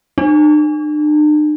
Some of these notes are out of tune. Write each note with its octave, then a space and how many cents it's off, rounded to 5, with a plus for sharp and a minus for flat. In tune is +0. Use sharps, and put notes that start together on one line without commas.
D4 +45